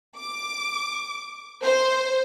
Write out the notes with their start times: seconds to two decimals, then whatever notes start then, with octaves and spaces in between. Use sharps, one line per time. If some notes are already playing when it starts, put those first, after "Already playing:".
0.17 D6
1.62 C5